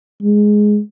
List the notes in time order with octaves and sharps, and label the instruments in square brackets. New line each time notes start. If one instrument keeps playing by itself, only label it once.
[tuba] G#3